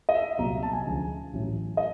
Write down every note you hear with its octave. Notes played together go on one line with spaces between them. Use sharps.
D#5
E5
C2 A#2 F#3 A#5
A5
G#5
D2 C#3 F3
A1 A2 F#3
D#5